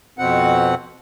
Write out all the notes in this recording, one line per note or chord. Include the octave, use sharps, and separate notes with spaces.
F2 B2 C4 F#5